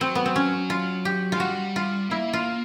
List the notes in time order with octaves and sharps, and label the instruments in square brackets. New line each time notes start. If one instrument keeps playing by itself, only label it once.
[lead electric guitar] F#3 [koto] C4
[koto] B3
C4
C#4
F4
G4
[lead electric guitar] G#3 [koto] F4
[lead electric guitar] G3 [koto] F#4
[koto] F4
[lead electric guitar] A#3 [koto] E4
[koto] F4